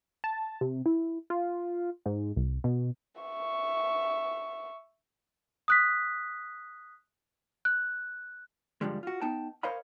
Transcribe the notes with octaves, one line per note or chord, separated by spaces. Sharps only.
A5
C3
E4
F4
G#2
C2
B2
E5 C#6
D#6 F#6 B6
F#6
G2 B2 D3 F3 G3 G#3
F4 F#4
B3 D#4 G5 A5
A#4 C5 C#5 D#5 F5 B5